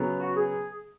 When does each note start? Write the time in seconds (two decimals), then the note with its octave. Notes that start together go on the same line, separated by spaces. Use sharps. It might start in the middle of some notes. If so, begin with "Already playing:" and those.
Already playing: C#3 F#3 B3
0.18 F#4
0.36 G#4